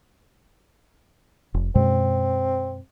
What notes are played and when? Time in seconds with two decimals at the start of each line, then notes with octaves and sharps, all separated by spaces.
1.54 F1
1.75 F#2 B2 G#3 C4